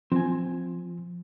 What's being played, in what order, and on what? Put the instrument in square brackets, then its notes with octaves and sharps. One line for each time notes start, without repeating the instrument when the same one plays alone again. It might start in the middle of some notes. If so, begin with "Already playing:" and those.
[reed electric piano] F3 [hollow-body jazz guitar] C4 G#5